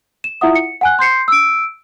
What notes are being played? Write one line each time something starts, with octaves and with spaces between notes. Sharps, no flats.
E7
E4 F4 E5 F#5 D#6
C#7
F#5 G#5 F#6
C6 G6 C7 C#7
E6 D7